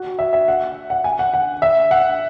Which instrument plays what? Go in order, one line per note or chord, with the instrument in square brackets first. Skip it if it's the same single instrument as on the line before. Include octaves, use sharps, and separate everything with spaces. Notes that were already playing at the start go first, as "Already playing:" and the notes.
Already playing: [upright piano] F#4
E5
E5
F#5
F#5
G#5
F#5
F#5
E5
F#5